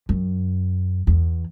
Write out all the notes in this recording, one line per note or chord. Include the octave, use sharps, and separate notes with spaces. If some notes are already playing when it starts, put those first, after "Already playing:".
F#2
E2